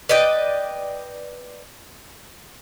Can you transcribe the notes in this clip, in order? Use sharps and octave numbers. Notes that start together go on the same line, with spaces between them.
B4 D5 D#5 G5